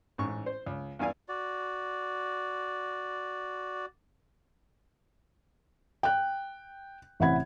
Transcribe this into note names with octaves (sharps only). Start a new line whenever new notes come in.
A1 G#2 C#6
C5
C#2
E2 G2 E3 D5 F5 G#5
F#4 D5
G5 F#6
A1 C3 E4 F#5 B5 G#6